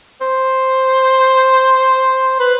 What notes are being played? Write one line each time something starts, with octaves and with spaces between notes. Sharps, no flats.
C5
B4